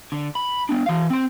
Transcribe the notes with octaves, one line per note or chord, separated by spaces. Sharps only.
D3
B5
B3 D4
E3 F5
C4 C6